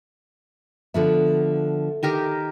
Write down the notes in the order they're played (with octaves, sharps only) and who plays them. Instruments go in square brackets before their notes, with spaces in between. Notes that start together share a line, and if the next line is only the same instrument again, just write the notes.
[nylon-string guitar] D3 F3 B3 [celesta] A4 E5
[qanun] D#3 G4 A#4